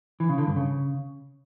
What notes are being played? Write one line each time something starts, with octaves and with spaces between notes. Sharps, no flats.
E3
C#3
D3
G2
C#3